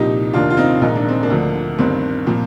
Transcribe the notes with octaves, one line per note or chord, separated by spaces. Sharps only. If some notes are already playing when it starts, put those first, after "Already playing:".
Already playing: C2 A#2 F3 D#4 G4
F1 D#2 D#3 D4 F4
F4
C4 D#4
A#1 G#2 D#3 D#4
D4
C4
A#3 D4
D2 D3 F3
G1 G2 D#3 C4
A#2 F3